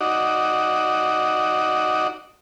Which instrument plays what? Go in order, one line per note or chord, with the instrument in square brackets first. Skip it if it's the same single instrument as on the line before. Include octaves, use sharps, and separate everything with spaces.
[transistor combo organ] D#4 F#4 D5